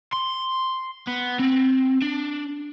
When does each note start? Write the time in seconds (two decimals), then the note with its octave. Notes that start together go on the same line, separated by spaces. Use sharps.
0.13 C6
1.07 B3
1.39 C4
2.02 D4